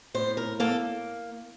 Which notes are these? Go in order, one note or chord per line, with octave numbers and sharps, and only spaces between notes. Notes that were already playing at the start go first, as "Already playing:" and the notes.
A2 C5
A#4
A#3 A4